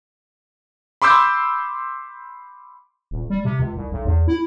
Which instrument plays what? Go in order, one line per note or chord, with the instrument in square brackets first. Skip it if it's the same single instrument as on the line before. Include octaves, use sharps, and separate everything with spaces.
[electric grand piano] B5 C6 D6 E6 G6
[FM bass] D#1
G3
C3
C#2
C2
B1
E2
E4